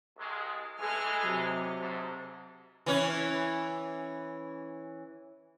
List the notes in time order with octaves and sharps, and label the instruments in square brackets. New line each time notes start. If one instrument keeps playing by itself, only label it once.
[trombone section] C2 G#3
[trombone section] E3 G#3 [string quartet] A4 G#5 F6
[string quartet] C3 F#3
[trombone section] D2 G#2
[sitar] E3 C#4